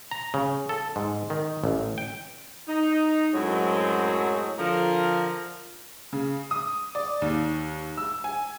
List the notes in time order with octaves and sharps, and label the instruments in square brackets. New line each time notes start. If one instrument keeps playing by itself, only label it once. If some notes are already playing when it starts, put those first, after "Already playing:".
[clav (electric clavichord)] A#5
C#3
A4
G#2
D#3
A1
G5
[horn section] D#4
F#2 A2 F#3 G#3 A3 C4
D3 F3 A#4
[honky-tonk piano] C#3
D#6
D5
D#2
E6
G#5